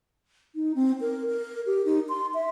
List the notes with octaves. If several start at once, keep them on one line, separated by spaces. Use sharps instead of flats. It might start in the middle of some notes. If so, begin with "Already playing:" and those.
D#4
C4
A#4
A#4
G4
D#4
C6
E5